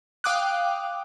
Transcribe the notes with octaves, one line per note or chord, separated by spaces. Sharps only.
F5 G5 D6 D#6 F#6